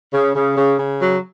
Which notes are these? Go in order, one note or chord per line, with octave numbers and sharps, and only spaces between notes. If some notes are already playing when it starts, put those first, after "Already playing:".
C#3
C#3
C#3
C#3
F#3